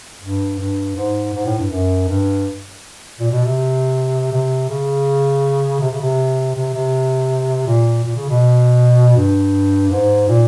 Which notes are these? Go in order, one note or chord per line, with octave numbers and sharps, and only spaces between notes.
G2
G2
G#2
G#2
A2
G2
F#2
G2
A#2
B2
C3
C3
C#3
C3
C#3
C3
C3
C3
A#2
A#2
C#3
B2
G2
G#2
A#2